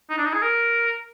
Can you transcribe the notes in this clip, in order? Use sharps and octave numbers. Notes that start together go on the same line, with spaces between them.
D#4
D4
D#4
G#4
A#4